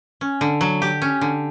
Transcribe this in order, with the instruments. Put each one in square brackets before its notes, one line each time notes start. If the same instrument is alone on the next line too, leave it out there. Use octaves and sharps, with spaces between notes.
[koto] C#4
D3
F#3
G4
C#4
D3